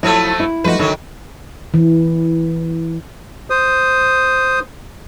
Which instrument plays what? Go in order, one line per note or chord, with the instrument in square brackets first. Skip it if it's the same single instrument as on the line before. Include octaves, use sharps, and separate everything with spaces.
[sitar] F3 F#3 A3 [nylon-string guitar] E4
[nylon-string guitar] E4
[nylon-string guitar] F3 A3 D#4 [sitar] F#4 B4
[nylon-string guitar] D3 [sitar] D#3 F#3
[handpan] E3
[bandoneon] C5 D#6